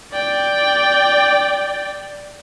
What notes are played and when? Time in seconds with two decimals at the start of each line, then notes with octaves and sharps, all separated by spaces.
0.12 D5 G5